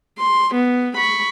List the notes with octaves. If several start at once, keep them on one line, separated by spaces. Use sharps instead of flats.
C6
B3
B5 C#6